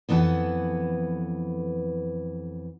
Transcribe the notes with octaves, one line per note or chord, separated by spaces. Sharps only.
F2 E3 B3 A4 F#5